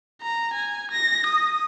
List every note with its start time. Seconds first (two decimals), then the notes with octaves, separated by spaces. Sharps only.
0.22 A#5
0.54 G#5
0.91 A#6
1.27 D#6